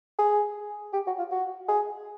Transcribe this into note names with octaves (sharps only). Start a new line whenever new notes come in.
G#4
G4
F#4
F4
F#4
G#4